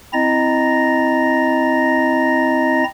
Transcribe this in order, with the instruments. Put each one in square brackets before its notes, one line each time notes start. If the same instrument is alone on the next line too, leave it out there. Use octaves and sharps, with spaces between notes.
[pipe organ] C4 E4 D#5 A#5 A6 A#6